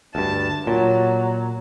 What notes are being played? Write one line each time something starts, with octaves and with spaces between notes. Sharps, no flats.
D2 G2 A5
A#2 F#3